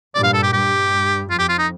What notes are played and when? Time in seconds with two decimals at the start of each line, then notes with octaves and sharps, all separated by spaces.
0.14 G2 A#2 D5
0.23 F5
0.34 A4
0.43 G4
0.53 G2 G4
1.29 F2 F4
1.39 G4
1.49 F4
1.58 D#4